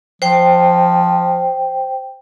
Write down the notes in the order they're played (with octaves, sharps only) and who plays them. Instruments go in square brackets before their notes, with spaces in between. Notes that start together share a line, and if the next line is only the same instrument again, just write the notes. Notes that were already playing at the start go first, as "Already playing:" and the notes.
[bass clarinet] F3 [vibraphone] C5 G5